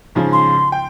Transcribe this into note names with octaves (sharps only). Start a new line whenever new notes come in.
G#2 C#3 F3
C6
G5